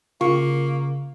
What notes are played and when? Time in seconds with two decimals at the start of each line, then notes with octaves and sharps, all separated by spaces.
0.21 C#3 A#3 F4 C#6